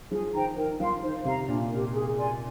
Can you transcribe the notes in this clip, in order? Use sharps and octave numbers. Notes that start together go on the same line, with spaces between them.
F3 G#4
D#3 C5 G5 A#5
D#3 A#4
F3 F5 C6
D#3 C5
C3 F5 A#5
A#2 D4
G4 A#4
G#4
D5 G#5 C6